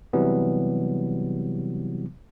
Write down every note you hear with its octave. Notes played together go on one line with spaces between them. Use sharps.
C3 E3 F#3 G3 B3